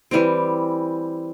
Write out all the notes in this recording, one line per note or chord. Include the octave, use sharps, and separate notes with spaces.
E3 G3 C4